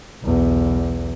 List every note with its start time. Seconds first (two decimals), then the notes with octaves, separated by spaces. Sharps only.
0.22 B1 E2